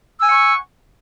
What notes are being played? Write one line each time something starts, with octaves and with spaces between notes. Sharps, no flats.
F#5 G#5 C#6 E6